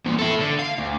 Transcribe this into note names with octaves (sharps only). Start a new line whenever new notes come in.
E2 A#2
E4 A4
D3
F5
D2